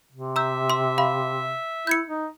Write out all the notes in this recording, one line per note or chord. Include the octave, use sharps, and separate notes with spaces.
C3
E5 A#5 E6 G6
C6 E6
F5 B5
E4 G6 G#6 C#7
D#4